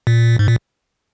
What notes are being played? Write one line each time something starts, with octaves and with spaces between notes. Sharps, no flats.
A#2
G#2
A#2